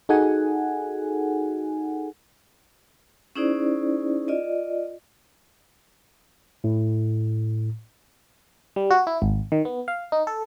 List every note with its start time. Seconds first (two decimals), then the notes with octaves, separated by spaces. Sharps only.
0.09 D#4 F#4 G#4 A4 F#5 G#5
3.36 C#4 D#4 E4 G#4 C5 D5
4.28 F4 D5 D#5
6.64 A2
8.76 G3
8.91 F#4
9.07 E4
9.22 G#1
9.52 D#3
9.65 B3
9.88 F5
10.12 D#4
10.27 A4